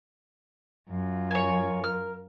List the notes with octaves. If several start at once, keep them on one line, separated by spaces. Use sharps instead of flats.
F#2 F4
A#4 C#5 G#5
A#4 F6